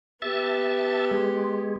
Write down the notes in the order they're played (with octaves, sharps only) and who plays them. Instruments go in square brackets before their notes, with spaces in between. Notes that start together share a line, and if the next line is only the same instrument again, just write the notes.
[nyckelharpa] B3 G4 [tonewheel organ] E5 A5
[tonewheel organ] G#3